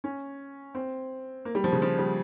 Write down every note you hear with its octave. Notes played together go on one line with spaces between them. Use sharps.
C#4
C4
A#3
G3
F3
C#3
F3
G3